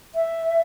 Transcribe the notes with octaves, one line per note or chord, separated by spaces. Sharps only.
E5